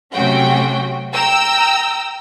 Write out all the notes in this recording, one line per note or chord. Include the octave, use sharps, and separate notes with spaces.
C3 F#3 A3 C#4 F#4 G5
G5 A#5 E6